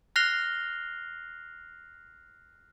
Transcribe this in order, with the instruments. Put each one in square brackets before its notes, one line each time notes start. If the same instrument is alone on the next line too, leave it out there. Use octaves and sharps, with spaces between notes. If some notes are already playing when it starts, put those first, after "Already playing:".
[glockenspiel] F6 F#6 A#6 C7 F7 G7